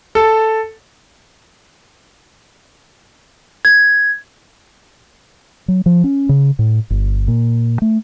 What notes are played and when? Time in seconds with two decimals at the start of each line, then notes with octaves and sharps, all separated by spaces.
0.15 A4
3.65 G#6
5.68 F#3
5.86 F3
6.04 C#4
6.29 C#3
6.59 A2
6.90 G1
7.28 A#2
7.82 A3